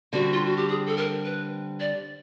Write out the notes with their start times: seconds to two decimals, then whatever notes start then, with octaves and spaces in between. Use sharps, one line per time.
0.13 D3 G3 C4 F#4
0.33 F4
0.45 F#4
0.57 G4
0.69 G#4
0.86 A4
0.97 A#4
1.25 B4
1.80 D5